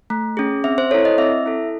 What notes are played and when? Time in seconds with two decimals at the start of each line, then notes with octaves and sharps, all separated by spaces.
0.10 A3
0.37 C#4 G#4
0.64 C4 E5
0.78 C5
0.91 E4 A4 C#5
1.05 D#5
1.18 C4 E5
1.46 E4 A4